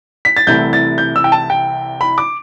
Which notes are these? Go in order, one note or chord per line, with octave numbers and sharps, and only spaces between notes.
B6
A6
C2 C3 E3 A3 E4 G6
A6
G6
E6
G5
A5
G5
B5
D6